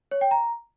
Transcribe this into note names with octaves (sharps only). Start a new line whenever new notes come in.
C#5
G5
A#5